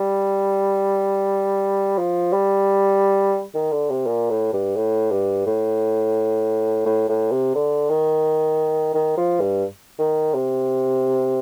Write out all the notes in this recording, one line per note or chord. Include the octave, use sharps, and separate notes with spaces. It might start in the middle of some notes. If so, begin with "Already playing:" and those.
Already playing: G3
F3
G3
D#3
D3
C3
A#2
A2
G2
A2
G2
A2
A2
A2
C3
D3
D#3
D#3
F3
G2
D#3
C3